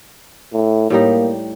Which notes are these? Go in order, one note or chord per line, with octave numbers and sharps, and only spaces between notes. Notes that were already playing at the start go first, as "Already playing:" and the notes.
A2
A2 G3 A#3 D#4